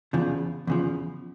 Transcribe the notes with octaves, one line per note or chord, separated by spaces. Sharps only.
E2 C#3 F3
E2 C#3 F3